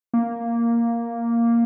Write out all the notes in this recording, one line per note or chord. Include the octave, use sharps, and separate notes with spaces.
A#3